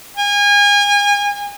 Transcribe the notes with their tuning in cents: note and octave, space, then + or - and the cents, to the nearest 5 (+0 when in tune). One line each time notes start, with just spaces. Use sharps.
G#5 -30